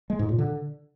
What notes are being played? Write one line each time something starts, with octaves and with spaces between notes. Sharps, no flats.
G#3
G#2
A#2
D3